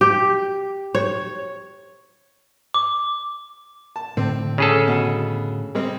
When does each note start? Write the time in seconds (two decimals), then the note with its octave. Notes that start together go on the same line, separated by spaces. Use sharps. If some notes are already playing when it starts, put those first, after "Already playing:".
0.01 G4
0.95 C#5
2.74 D6
3.96 A5
4.17 A2 D3 C4
4.58 C#3 G#4 A4
4.88 B2
5.75 G3 G#3 C4